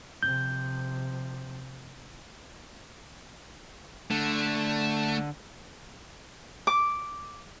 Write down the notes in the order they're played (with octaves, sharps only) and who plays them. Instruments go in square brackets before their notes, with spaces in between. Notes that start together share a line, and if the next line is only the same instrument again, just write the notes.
[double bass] C3 F3 [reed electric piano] G6
[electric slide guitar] D3 [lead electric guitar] A3
[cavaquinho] D6